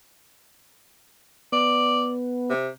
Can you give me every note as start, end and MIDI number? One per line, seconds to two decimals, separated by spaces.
1.52 2.54 59
1.52 2.11 74
2.49 2.69 48